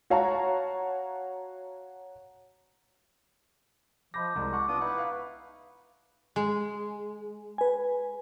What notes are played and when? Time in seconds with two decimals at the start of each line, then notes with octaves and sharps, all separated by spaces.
0.10 F#4 C#5 F5 F#5 A5 A#5
4.14 F3 D#5 B5 D6 G6 A#6
4.36 C2 G#3
4.53 F#5 A5 C#6 D6
4.68 B3 D4 F4 D#6
4.80 D#4 E4 B4 F#5
4.98 F5
6.36 G#3
7.58 B4 G#5